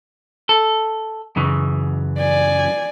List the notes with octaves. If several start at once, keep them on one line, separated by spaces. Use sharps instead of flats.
A4
F#2 C#3 E3
D5 G#5